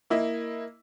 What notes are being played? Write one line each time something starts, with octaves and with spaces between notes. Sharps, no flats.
A#3 E4 D#5